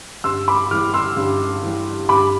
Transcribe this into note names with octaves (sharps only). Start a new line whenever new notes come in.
G2 C6 E6
B5 D6
E3 G3 D6 F6
C6 E6
G2
E3 G3
G2 B5 D6